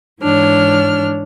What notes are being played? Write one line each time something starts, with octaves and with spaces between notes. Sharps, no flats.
G#2 E3 D4 C#5 F6